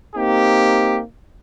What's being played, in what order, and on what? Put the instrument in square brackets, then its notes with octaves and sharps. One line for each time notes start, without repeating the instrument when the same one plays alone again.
[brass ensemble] A#3 C4 D#4 G4